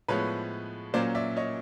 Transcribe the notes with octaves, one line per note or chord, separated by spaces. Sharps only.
A2 F3 G#3 B3 B4 C#5
A#2 F#3 A#3 C#4 C5 D5
D5 E5
C#5 D#5